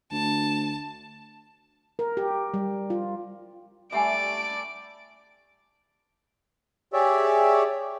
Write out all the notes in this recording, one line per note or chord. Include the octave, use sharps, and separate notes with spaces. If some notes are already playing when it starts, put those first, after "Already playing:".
D2 A5
A#4
G4
G3
F4
G3 A3 D5 E5 F#5 G#5 D7
G4 G#4 C#5 D5 E5